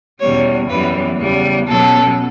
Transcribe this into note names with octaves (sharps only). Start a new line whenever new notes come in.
E2 B2 G3 C#4 C#5
F#2 E3 G3 B3 B4
E2 C#3 G3 B3
B2 F#3 C#4 A4